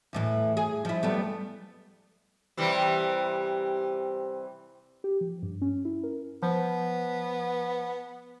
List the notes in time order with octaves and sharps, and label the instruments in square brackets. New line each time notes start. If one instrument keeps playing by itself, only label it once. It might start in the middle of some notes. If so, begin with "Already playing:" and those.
[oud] E2 A2 E3
G#4
F3 E4
G3 A3 B3
[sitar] C3 E3 G3
[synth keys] G4
F3
G2
C#4
E4
A#4
[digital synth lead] F3 [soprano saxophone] B3